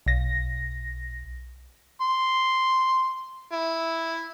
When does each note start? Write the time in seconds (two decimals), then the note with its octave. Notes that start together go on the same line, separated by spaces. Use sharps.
0.06 B1 A#6
2.01 C6
3.52 E4